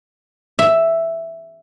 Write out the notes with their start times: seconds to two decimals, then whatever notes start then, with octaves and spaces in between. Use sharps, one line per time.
0.59 E5